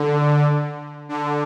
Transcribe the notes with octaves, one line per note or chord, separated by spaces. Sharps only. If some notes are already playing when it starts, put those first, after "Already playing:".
Already playing: D3
D3